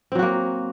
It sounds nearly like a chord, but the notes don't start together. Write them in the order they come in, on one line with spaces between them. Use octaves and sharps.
C4 F#3 F#4 A#3